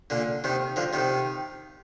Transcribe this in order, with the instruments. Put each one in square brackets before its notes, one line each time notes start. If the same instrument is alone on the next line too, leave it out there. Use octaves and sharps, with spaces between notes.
[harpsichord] A#2 D3
C3 D#3
D3 F3
C3 D#3